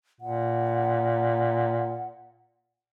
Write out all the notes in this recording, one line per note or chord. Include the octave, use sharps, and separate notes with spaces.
A#2 F#5